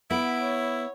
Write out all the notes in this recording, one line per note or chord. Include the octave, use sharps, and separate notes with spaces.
B3 E4 B5 D7
C#5